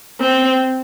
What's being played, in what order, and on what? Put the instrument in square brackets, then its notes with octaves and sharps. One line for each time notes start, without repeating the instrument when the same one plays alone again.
[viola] C4